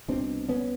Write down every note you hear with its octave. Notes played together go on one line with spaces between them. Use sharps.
C2 B2 C4 D4
B3 C#4